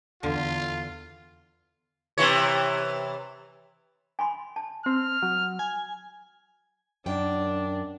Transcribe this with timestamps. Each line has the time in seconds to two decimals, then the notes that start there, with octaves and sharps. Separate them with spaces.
0.23 E2 D3 F4
2.18 C3 E3 C#5
4.19 G#5 B5 C6
4.56 A5
4.86 C4 F6
5.23 F#3
5.59 G#5
7.06 F#2 D#3 D4 G5